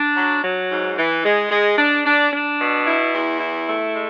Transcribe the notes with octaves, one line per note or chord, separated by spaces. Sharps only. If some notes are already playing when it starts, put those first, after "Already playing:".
Already playing: D4
F#3
F#3
G#2
E3
G#3
G#3
D4
D4
D4
B2
E4
E2
E4
A3
G#3